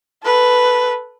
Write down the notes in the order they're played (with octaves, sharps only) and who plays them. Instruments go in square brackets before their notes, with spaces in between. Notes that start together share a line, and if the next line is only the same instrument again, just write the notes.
[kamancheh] A4 B4